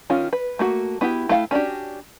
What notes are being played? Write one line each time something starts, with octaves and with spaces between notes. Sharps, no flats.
D#3 C#4 F4
B4
A3 A#3 F#4
B3 E4 F#4 G4
A3 E4 F5 G5
C#4 D4 F#4 G4